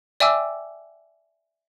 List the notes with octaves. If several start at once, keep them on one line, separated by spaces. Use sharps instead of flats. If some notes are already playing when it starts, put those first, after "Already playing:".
D5 E5 G5 G#5 D6 E6